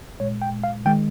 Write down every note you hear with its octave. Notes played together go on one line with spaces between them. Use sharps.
A#2 G#3 C#5
G5
F5
D#3 G#3 G5